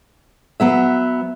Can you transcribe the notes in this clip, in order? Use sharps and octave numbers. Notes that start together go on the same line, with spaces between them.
F#3 B3 E5